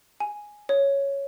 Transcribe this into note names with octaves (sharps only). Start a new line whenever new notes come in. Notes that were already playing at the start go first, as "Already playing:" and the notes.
G#5
C#5